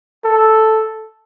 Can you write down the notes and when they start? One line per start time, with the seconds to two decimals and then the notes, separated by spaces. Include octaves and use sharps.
0.24 A4